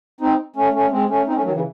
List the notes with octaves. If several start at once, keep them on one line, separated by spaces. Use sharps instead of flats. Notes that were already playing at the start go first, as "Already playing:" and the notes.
C4 D#4
A3 C#4
A3 C#4
G#3 C4
A3 C#4
C4 D#4
A3 C#4
D#3 F#3
C#3 E3